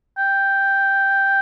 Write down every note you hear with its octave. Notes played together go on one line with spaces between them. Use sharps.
G5